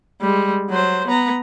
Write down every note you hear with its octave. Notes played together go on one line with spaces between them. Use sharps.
G3 G#3
F#3 C5
B3 A#5